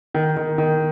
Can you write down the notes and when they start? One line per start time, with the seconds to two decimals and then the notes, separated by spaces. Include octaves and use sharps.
0.14 D#3
0.37 D#3
0.58 D#3